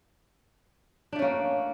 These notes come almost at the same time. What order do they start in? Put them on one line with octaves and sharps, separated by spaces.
D4 A3 C#4 A#3